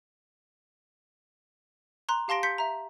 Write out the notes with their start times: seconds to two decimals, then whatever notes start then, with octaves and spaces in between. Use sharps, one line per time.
2.09 A#5 C6 F#6
2.28 G4 F5 A5 C6 A#6 D7
2.43 C6 G6 B6 C#7
2.58 E5 A#5